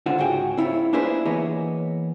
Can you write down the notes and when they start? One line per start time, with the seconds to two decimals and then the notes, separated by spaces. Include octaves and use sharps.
0.06 C#2 D3 F4 C5 F#5
0.18 C#2 G#2 F#4 G#4 G5
0.57 C4 E4 F4 C#5
0.93 A#3 D4 E4 G#4 B4 C5
1.25 E3 A#3 B3 G#4 C#5 D#5